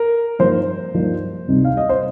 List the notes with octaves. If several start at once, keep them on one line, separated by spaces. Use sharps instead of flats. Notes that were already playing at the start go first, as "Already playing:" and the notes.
Already playing: A#4
G2 F3 A#3 D#4 C5
G2 F3 A#3 D#4
C2 C3 G3 D#4
F5
D#5
C5